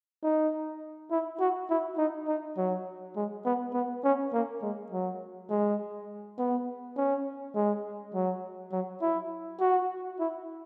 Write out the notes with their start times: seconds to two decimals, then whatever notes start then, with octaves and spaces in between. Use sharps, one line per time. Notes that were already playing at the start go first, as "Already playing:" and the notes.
0.23 D#4
1.11 E4
1.40 F#4
1.70 E4
1.98 D#4
2.28 D#4
2.57 F#3
3.17 G#3
3.45 B3
3.74 B3
4.04 C#4
4.34 A#3
4.62 G#3
4.92 F#3
5.50 G#3
6.39 B3
6.97 C#4
7.55 G#3
8.14 F#3
8.72 F#3
9.02 E4
9.60 F#4
10.20 E4